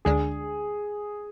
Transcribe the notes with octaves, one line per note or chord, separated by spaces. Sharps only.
D2 D3 G#3 D4 G#4